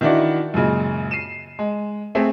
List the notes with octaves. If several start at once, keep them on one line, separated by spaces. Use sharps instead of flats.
D#3 E3 D4 E4 F#4 D5
F#2 A#2 C#3 G#3
C7 D#7 E7
G#3
A3 C4 G#4